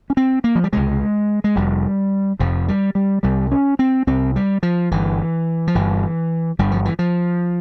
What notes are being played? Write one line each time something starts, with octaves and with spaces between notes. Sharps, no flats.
C#4
C4
A#3
F3
G3
C#2 C3 G#3
G#3
F1 F2 C3 G3
F1 F2 C3 F3
G3
G3
C2 C3 G3
C#4
C4
C2 C3 C4
G3
F3
G1 G2 E3
F3
G1 G2 E3
G1 G2 G3
F3
E3
F3